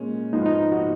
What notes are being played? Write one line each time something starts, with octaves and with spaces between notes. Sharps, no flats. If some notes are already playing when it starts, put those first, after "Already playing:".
Already playing: A#2 G#3 C#4
G#2 F3 B3 D#4 F4
D#4
F#4